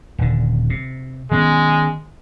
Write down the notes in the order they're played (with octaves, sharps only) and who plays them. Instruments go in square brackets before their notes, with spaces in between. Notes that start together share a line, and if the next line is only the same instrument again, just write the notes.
[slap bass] D#1 D3
C3
[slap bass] D#3 B3 C#4 [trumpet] G#3